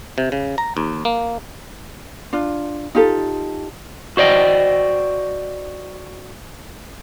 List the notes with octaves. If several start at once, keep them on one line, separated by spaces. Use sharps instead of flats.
C3
C#3
A#5
D#2
A#3
D4 F4
D#4 F4 G4 A4
F#4 C5 D5 D#5 G5